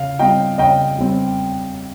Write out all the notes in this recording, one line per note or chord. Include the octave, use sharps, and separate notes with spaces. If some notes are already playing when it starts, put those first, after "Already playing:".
Already playing: C#3 F5
G3 C4 D#5 G5
C#3 D#5 G5
G3 C4